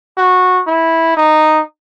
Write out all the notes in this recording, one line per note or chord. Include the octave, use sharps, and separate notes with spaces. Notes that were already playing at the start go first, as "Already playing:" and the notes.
F#4
E4
D#4